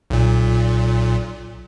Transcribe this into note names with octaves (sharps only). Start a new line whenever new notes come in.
B1 A#2